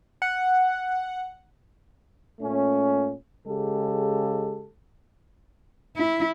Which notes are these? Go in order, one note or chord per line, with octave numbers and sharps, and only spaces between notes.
F#5
A#2 A3 C#4
C#3 G#3 G4 A4
E4